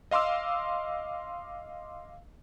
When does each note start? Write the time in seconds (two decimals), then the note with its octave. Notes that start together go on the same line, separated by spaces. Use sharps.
0.11 D#5 F5 C6 D6 E6